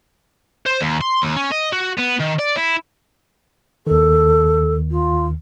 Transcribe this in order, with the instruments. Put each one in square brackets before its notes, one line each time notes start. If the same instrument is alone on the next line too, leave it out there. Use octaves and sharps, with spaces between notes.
[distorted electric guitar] C5
D#2
C6
D#2
C#4
D#5
F#4
B3
D#3
D5
E4
[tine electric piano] D#2 D#3 [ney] A4
[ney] F4